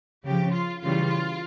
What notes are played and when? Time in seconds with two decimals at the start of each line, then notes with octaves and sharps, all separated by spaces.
0.24 C#3 F3 G4
0.54 F4
0.82 C#3 E3 G3 F4